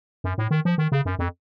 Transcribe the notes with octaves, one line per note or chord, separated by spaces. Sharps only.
F#2
A2
D#3
F3
D#3
C#3
F#2
F2